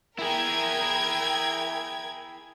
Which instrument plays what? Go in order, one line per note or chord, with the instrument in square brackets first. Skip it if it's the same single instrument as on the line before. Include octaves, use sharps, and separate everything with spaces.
[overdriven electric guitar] E4 G#4 [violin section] A#4 G5 G#6